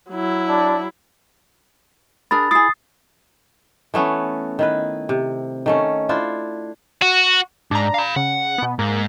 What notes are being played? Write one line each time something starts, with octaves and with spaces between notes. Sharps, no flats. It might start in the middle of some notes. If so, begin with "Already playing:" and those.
F#3 E4
D4
D4 G#4 A#4 B5 A6
E4 G#4 D#6 A6 C7
E3 A3 B3 C#4
D#3 E4 B4
C3
D#3 A3 C#4
D4 E4 F4 C5
F#4
G#2 D4 A#5
F5 B5
C#3 F#5
B2 B3
G#2 A#3